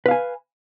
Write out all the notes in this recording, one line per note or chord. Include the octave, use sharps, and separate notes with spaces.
B4 F5 G#5